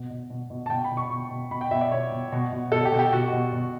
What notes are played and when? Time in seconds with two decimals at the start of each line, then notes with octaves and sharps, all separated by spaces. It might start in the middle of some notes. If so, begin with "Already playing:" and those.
Already playing: B2
0.10 B2
0.30 B2
0.50 B2
0.66 A5
0.70 B2 G5
0.84 B5
0.91 B2
0.97 C#6
1.10 B2
1.31 B2
1.51 B2 B5
1.61 G5
1.71 B2 E5
1.81 D5
1.91 B2 C#5
2.12 B2
2.32 B2
2.52 B2
2.72 B2 A4
2.85 G4
2.92 B2
2.99 G4
3.12 B2 F#4
3.33 B2
3.53 B2